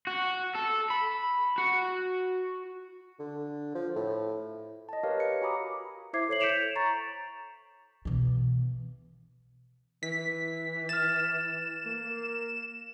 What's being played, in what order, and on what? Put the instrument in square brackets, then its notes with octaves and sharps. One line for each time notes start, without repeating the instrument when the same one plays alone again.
[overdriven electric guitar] F#4
A4
B5
F#4
[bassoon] D3
F3
A2
[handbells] D#5 A5
G4 A#4 B4 C#5 F5
C#7
F#4 G#5 A#5 B5 D6 D#6
[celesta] E4 C5 E5 D6 G#6 C7
A4 C#5 C7 F#7
G6 B6 C#7 D7 E7 F7
A#5 C#6 A6
[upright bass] B2 E3
[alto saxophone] E3 [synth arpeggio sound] B6
[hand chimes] F6 A6 [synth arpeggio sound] E7
[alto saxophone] A#3